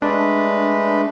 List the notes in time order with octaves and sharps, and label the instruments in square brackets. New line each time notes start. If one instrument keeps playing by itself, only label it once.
[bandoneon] G#3 A3 B4 [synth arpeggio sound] D4